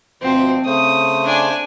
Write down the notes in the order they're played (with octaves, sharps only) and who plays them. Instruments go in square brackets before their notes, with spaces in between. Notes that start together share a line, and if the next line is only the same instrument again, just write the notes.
[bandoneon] D2 B2 F3 [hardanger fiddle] C4
[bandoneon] C#3 A3 C5 [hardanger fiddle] D#6
[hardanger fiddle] D4 G#5